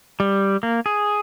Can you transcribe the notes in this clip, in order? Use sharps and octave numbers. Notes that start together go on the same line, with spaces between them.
G3
A#3
G#4